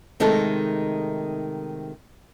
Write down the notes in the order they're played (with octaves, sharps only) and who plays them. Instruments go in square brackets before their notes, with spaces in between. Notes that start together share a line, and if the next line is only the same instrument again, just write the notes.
[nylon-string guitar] C3 D#3 G#3 A3 D#4 A4